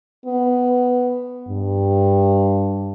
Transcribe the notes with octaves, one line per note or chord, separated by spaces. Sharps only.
B3
G2